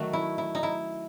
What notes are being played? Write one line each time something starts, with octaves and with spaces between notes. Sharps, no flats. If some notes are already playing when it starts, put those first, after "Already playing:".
Already playing: D#3 F#3 A3 F#4
E4
E4
D#4
E4